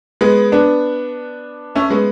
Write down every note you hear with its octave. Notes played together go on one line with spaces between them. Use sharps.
G#3 B3
B3 D4
A3 C#4
G#3 B3